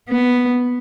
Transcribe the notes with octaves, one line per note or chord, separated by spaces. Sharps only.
B3